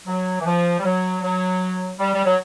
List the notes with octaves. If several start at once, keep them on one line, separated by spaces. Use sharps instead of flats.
F#3
E3
F3
G3
F#3
F#3
G3
G3
F#3